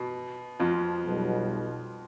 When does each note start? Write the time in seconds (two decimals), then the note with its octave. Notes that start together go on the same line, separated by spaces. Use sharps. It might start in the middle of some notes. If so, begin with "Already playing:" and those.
Already playing: B2
0.59 F2 F3
1.05 B1 B2 G3